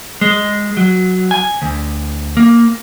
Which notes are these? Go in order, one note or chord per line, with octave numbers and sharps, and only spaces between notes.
G#3
F#3
G#5
D2
A#3